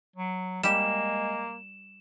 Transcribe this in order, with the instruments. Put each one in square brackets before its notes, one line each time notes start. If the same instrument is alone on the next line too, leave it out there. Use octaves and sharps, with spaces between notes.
[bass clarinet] F#3
[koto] G3 G4 [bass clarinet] G#3 [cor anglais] A#3 [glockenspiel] E7